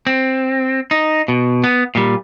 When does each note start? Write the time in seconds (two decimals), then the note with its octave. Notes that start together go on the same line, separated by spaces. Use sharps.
0.07 C4
0.91 D#4
1.28 B2
1.64 B3
1.95 A#2 G3